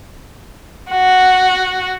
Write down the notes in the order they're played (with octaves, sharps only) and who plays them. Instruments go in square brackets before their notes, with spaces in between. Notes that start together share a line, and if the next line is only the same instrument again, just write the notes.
[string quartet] F#4 [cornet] F#5